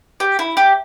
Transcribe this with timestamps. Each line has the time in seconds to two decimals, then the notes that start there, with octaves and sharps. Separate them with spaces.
0.20 G4
0.39 E4
0.57 G4